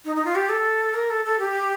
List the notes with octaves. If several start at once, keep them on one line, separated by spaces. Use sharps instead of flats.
D#4
D#4
F4
G4
A4
A#4
A4
A4
G4